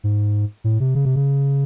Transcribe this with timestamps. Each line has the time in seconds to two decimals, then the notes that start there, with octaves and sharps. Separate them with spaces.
0.04 G#2
0.64 A2
0.80 C3
0.95 C#3
1.05 C3
1.16 C#3